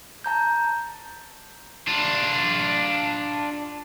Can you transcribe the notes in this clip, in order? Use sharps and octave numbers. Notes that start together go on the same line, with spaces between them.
A5 A#5 G6
D4 F4